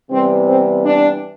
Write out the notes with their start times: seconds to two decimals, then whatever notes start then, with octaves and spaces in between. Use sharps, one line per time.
0.11 C3 E3 G3 B3 C4
0.48 C4
0.85 D4